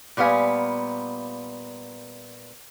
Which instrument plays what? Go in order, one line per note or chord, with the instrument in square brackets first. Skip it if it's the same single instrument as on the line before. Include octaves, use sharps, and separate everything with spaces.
[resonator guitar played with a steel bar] A#2 G3 B3 F5 G#5